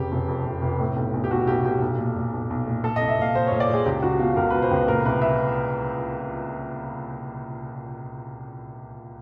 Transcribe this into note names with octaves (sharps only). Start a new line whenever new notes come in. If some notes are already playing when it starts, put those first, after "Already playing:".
Already playing: F1 C#3 G4
F1
F2
F1
F1
A2
B1
B1
G4
B1 F#4
B1 G4
B1 G4
B1
A#2
A#2
B1
B1
A#2
A#2 A4
C2 D#5
E5
A#2 F5
A#2 C5
A#2 C#5
D5
A#2 G#4
C#2 G4
C#2 F#4
B2 F4
C#2 A#4
B2 B4
C5
C#2 B4
A#2 A#4
C2 B4
E5